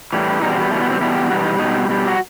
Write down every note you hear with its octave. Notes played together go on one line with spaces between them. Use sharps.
A2 E3 G3
E2 B2 G3 D#4
C4
B3
E2 B2 G3 A3
B3
C4
E2 B2 G3 E4
G4
E2 B2 G3 F#4
D#4
B2 G3 D#4
B2 G3
F#4